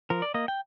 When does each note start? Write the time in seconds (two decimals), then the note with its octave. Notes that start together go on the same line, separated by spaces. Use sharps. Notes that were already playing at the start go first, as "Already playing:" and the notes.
0.10 F3 A#4
0.22 D5
0.34 A#3 D#5
0.48 G5